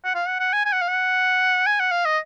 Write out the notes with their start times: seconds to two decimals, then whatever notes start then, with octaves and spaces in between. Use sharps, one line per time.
0.05 F#5
0.15 F5
0.28 F#5
0.40 F#5
0.53 G#5
0.65 G#5
0.73 F#5
0.82 F5
0.88 F#5
1.66 G#5
1.80 F#5
1.91 F5
2.05 D#5